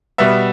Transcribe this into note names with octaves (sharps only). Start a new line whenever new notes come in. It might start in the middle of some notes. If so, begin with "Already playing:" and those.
B2 G3 B3 E5